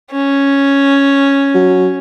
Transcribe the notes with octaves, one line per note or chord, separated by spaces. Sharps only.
C#4
F#3